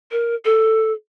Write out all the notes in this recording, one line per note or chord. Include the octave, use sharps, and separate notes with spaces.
A#4
A4